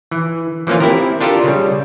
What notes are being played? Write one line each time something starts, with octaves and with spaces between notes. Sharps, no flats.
E3
E3 F3 A#3 C#4 F4
C4 E4 G4 A#4
D4 F4 G4 A4 A#4
C#3 G3